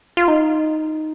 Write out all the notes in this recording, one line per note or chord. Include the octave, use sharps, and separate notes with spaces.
F4
D#4